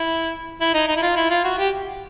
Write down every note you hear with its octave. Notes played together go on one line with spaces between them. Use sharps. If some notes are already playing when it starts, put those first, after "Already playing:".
Already playing: E4
E4
D#4
D#4
E4
F4
E4
F4
F#4
G4